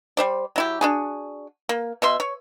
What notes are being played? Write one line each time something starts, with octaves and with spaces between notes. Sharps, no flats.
G3 C5 D5
F#3 E4 G4
D4 F#4 G#4
A#3
B2 E5 C6
C#5